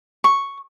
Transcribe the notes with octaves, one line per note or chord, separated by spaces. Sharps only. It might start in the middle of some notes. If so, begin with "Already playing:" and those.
C#6